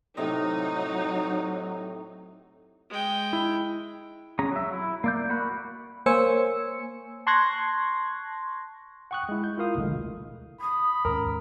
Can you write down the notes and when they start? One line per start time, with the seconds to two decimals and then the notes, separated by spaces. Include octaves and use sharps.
0.17 A2 C3 F#3 D#4 D#5
2.90 G#3 G5
3.33 E4
4.39 C#4 G#4 A#5
4.52 F#3 E5
4.73 E4
5.04 A#3 D5 G6
5.30 F#4 A#4 B5 F#6
6.06 A#3 C5 C#5 G#5 E6 C#7
7.27 A5 C6 C#6 F#6 G#6 A#6
9.11 F#5 G5 C#6 D#6 F#6
9.29 G#3 E4
9.44 G6
9.58 E4 F4 A#4 F5 D#6
9.75 G#1 D2 B2 D3 F3 G#3
10.61 B5 D#6
11.05 D#2 G#2 C#4 A#4